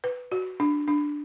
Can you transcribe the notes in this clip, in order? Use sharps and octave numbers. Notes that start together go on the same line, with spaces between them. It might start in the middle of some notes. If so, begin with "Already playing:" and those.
B4
F#4
D4
D4